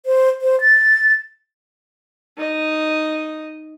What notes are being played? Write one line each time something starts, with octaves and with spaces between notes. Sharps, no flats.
C5
C5
A6
D#4 D#5